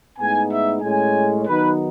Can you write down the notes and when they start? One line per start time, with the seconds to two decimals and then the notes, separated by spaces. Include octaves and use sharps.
0.19 A2 G#3 B3 D#4 G#5
0.51 E5
0.82 A2 G#3 C#4 G#5
1.47 D#3 F#3 B3 D#4 B4